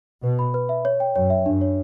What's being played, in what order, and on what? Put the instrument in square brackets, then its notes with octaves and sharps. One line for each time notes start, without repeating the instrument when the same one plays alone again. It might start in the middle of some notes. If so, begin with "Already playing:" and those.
[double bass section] B2 [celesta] B4
[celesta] B5
B4
E5
C#5
G5
[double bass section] F#2 [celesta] C#5
[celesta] E5
[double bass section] F#2 [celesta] D4
[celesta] C#5